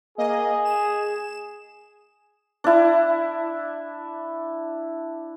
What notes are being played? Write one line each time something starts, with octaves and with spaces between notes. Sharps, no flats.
A#3 G#4 D#5
E7
D4 E4